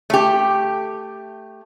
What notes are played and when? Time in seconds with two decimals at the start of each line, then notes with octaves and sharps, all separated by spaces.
0.10 A3 G4